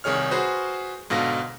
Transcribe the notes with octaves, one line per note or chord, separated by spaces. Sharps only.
C2 D#3 G#4 C#5 F6
F#4 G#4 B4 C5
G#2 B2 D3 F5 A#6